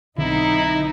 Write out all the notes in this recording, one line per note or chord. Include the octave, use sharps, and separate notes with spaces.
B1 D3 C4 D#4 E4